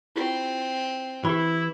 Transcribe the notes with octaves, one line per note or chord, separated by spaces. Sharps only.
C4 E4 F4 G4
E3 E4 G4 B5